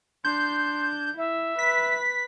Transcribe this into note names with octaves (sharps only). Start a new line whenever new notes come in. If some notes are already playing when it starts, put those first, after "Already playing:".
D4 C6 G6
E4 E5
B4 B6